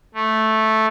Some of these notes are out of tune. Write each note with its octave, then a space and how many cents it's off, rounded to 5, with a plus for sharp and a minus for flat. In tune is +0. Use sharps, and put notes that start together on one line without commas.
A3 -5